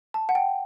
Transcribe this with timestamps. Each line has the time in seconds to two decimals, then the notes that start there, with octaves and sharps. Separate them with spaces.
0.14 A5
0.29 F#5
0.35 G5